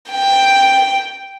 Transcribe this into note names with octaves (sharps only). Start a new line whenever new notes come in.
G5